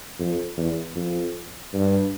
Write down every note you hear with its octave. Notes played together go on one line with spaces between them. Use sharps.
F2
E2
F2
G2